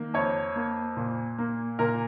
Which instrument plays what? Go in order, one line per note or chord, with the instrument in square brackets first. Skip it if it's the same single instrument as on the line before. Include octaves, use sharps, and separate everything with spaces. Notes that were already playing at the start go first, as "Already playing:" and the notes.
Already playing: [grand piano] D#3 A#3
F2 C#5
A#3
A#2
A#3
A#2 A#4